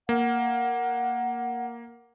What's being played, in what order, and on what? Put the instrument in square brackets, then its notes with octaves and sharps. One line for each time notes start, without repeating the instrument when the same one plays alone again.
[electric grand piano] A#3 [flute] F#5